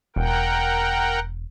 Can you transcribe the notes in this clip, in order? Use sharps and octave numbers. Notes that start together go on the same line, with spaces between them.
E1 A#4 F#5 G5